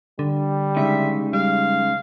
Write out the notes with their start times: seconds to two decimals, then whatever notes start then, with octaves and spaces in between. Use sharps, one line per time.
0.19 D3 G3
0.77 C#3 G#3 D#4 E5
1.33 G3 F5